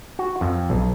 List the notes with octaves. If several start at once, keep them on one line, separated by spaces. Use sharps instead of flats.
F#4
F2
B1